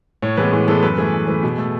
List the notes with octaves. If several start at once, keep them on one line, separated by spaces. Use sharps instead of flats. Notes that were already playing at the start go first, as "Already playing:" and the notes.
A2 C#5
E3 G#3 B3 B4
A2 G#4
E3 G#3 B3 A4
F#2 B4
E3 A3 G#4
F#2
E3 A3
B2
A3